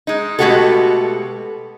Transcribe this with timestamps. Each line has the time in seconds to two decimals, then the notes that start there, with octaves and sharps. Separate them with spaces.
0.07 G#3 D#4
0.39 B2 G#3 A3 F#4 G4 A4